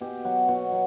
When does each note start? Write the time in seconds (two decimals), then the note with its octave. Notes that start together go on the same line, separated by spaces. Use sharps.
0.01 B2 G4
0.25 F#3 F#4
0.48 B2 F#4
0.72 F#3